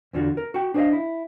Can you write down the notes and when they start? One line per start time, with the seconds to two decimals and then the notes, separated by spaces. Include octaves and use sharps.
0.13 E2 D3 F4 F#4
0.37 A#4
0.54 F#4 G5
0.74 D4 G#4 C5 C#5 D#5 F5
0.92 E4